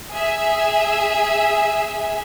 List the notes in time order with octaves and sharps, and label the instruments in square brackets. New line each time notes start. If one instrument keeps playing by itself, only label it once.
[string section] G#4 E5